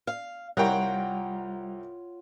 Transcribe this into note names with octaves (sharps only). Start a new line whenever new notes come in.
F5
C2 G3 F4 A#4 C#5 F#5 G5